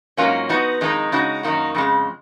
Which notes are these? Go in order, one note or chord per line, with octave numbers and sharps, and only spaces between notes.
G#2 F#3 A#3 C#4 F4
F3 B3 D#4 F#4
F2 D#3 G#3 D#4
C#3 G#3 D#4 F#4
F#2 D#3 A#3 D#4 F#4
F2 C#3 G#3